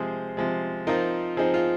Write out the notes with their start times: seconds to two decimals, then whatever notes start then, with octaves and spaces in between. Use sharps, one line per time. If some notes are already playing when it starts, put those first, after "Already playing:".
Already playing: C3 F3 G#3 G#4 C5
0.37 C3 F3 G#3
0.87 F3 C4 D#4 F4 A#4
1.37 F3 C4 D#4 G#4
1.54 F4